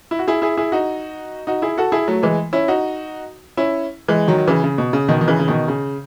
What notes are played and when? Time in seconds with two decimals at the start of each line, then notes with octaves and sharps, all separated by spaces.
0.11 E4
0.19 F#4
0.28 E4 G#4
0.42 E4 G#4
0.57 E4 G#4
0.72 D#4 F#4
1.47 D#4 F#4
1.62 E4 G#4
1.77 F#4 A4
1.92 E4 G#4
2.08 F#3 A3
2.23 E3 G#3
2.53 C#4 E4
2.68 D#4 F#4
3.57 C#4 E4
4.08 E3 G#3
4.28 D#3 F#3
4.38 F#3
4.48 C#3 E3
4.64 C#3
4.78 B2
4.93 C#3
5.08 B2 D#3
5.21 D#3
5.28 C#3 E3
5.39 C#3
5.48 B2 D#3
5.68 C#3